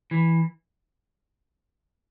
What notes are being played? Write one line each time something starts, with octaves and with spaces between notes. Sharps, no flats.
E3